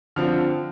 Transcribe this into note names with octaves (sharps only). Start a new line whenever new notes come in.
D3 F3 C4 F6